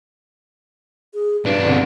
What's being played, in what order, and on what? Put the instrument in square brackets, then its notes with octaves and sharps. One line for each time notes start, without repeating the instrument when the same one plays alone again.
[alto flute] G#4
[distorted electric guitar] B1 D4 [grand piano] G2 [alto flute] B4
[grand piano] G1 C2